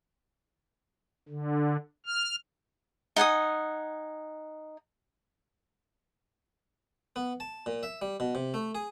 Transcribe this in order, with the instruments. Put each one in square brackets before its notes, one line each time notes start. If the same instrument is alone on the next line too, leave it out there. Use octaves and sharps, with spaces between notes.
[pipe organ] D3
F6
[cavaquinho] D#4 F#5 G#5 D#6
[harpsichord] B3
A5
A#2
E5
G3
B2
C3
A3
G#4